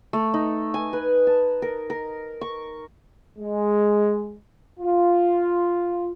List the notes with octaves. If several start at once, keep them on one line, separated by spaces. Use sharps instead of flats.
A3
D#4
G#5
B4
A5
A#4
A#4
C#6
G#3
F4